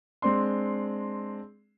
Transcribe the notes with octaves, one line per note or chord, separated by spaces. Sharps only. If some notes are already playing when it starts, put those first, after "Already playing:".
G#3 C4 D4 C6